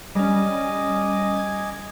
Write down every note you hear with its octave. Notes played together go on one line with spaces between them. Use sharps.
G3 C#4 D#5 G#5 D6
G#6